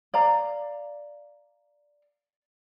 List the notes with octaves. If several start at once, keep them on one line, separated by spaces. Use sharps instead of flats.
D5 F5 A#5